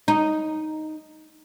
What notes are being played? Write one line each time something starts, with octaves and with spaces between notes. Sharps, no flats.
D#4